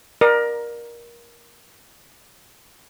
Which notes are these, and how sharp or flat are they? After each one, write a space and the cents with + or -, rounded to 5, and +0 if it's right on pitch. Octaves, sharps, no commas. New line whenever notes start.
A#4 +20 D5 +30